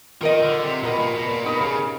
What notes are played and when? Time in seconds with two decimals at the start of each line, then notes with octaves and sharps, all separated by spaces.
0.21 D#3 F4 A#4 D#5
0.42 D3
0.62 C3
0.83 B2 F4 A#4 D#5
0.99 A#2
1.14 B2
1.29 A#2
1.45 B2 D#4 G4 A#4
1.61 C#3